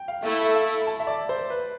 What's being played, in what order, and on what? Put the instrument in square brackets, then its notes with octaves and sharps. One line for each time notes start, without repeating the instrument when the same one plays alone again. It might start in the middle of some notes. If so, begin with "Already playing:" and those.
Already playing: [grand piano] G5
F5
[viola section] A3 E4 A4 [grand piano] E5
[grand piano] E5
F5
B5
A5
E5
D5
C5
B4